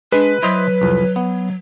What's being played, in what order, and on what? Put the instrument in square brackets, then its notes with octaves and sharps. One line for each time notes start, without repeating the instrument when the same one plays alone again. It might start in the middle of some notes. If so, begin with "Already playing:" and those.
[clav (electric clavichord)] G#3 [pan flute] D4 [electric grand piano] B4
[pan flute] F#3 [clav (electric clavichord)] E4 C5 D#5
[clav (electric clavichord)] C2 F2
B3